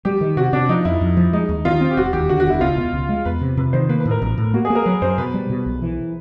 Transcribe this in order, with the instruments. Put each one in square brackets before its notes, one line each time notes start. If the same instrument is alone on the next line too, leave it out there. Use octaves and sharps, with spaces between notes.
[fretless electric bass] G3 [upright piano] G4
[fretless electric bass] D#3
[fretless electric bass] C3 [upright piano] F#4
[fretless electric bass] C3 [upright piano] D4
[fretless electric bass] F3 [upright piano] D#4
[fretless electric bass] F2 [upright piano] E4
[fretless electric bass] F2
F3
[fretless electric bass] G#3 [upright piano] D#4
[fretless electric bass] D#2
[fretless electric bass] D#3 [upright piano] F4
[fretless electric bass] C4
[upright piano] G4
[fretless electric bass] E1 [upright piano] F#4
[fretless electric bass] D#2 [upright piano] G4
[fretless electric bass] D3 [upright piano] F#4
[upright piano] F#4
[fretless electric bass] E1 [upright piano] E4
[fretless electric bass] C#2 [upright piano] F4
[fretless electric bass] B2
C#2
G#3
[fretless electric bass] E2 [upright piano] B4
[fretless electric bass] C3
[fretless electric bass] C3 [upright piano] B4
[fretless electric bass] D#3 [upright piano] C5
[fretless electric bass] A#3 [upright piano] B4
[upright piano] B4
[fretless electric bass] A2
[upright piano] A#4
[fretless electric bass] A1
A2
[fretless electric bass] A#3 [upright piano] F#4
[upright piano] G#4
[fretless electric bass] A#3
[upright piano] A#4
[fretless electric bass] F#3 [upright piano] B4
[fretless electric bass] F#2 [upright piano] C5
[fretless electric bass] B2 [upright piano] B4
[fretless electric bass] G3
B2
B1
E3